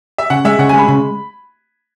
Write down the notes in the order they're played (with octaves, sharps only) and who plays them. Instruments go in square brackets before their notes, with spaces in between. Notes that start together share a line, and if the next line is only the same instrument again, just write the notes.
[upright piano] E5
[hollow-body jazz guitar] C#3 [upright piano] F#5
[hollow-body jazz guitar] G#3 [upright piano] E5
[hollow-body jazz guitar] C#3 [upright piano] F#5
[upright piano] G#5
[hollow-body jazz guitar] G#3 [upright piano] B5
[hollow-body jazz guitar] C#3